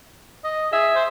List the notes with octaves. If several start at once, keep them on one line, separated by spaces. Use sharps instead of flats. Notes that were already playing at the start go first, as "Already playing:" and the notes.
D#5
G#4 E5
C5